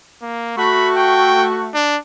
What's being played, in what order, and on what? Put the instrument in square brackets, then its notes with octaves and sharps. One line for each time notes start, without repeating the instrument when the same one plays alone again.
[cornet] A#3
[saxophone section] A3 F#4 [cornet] B5
[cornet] G5
D4